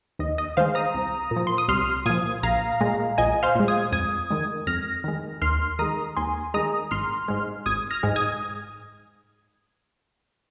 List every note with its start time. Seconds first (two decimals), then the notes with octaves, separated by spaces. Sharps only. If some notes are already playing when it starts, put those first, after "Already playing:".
0.19 D#2 D#5
0.38 D#5
0.57 D#3 G#3 C5 F5
0.75 A#5 D#6
0.94 C2
1.31 A#2
1.36 F3
1.47 C6
1.58 D#6
1.68 C2 C6 F6
2.06 A#2 F3 D#6 G#6
2.43 A#1 F5 A#5
2.81 A#2 G#3
3.18 A#1 D#5 G#5
3.43 C5 F5
3.55 A#2 G#3
3.68 D#6 G#6
3.92 F2 D#6 G#6
4.30 D#3 G#3
4.67 F2 F6 A#6
5.04 D#3 G#3
5.42 D#2 C6 F6
5.79 D#3 G#3 A#5 D#6
6.16 D#2 G#5 C6
6.54 D#3 G#3 A#5 D#6
6.91 G#1 C6 F6
7.28 G#2 G#3
7.66 G#1 D#6 G#6
7.91 F6 A#6
8.03 G#2 G#3
8.16 D#6 G#6